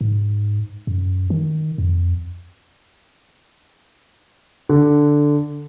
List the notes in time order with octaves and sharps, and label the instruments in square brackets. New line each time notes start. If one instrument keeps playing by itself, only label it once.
[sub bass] G#2
F#2
D#3
F2
[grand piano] D3